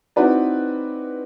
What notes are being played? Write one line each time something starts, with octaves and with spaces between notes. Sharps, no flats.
C4 D#4 E4 F#4 B4 D5